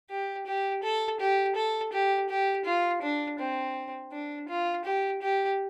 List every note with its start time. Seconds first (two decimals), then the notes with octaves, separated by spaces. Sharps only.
0.10 G4
0.47 G4
0.83 A4
1.20 G4
1.56 A4
1.93 G4
2.29 G4
2.65 F4
3.02 D4
3.39 C4
4.12 D4
4.49 F4
4.85 G4
5.22 G4